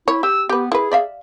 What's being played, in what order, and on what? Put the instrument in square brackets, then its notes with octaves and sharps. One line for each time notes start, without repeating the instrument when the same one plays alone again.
[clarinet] E4 [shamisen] C#5
[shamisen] G4 [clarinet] E6
[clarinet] B3 [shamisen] G4 B4
[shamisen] E4 B4 [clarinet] G#4
[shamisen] D5 E5 F5